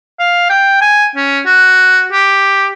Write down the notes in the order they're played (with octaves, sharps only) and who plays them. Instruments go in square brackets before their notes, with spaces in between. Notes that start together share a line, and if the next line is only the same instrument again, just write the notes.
[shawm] F5
G5
G#5
C#4
F#4
G4